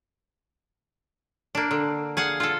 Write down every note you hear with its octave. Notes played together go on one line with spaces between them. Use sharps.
A#3 D4
D3
G#4 F5 F#5
F4 A4